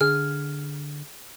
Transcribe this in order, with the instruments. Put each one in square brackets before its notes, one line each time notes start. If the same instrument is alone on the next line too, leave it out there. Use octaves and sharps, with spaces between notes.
[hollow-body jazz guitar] D3 [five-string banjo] G#4 [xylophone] F6